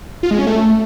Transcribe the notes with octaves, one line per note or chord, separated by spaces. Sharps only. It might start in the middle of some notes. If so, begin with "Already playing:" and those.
F4
G#3
C#4
A3